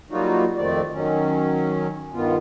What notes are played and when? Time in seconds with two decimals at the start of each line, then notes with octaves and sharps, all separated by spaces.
0.11 F#3 G3 A#3 D#4 F4 F#4
0.57 F2 D#3 A3 C4 D5
0.93 D#3 F#3 C#4
2.14 G2 D#3 B3 F4